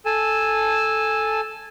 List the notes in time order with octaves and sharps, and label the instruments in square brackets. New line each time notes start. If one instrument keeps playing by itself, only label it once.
[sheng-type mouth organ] A4 G#5 A5